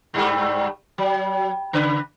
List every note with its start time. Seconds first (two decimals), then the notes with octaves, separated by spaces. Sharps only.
0.14 G2 G3 A3
0.98 F#3
1.73 C#3 B4